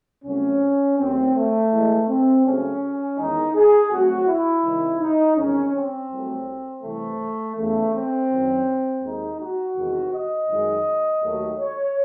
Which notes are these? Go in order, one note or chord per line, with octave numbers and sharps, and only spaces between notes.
C2 C3 F#3 A3 C#4
D#2 D#3 F#3 A3 C4
A3
A2 E3 G#3
C4
C#2 C#3 F#3 A3 C#4
E2 D#3 G#3 D#4
G#4
C2 C3 F#3 A3 F#4
E4
C2 C3 D#3
D#4
E2 C3 D#3 G#3 C#4
C4
C2 C3 F#3 A3
C2 C3 E3 A3
E2 C#3 E3 A3
C4
F#2 D#3 F#3
D#2 D#3 G#3 D#4
F#4
E2 C3 D#3 G#3
D#5
F#2 D#3 G#3
D#2 D#3 F#3 A3
C#5